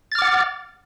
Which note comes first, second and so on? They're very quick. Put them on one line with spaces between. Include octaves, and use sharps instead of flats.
A6 F6 D6 F#5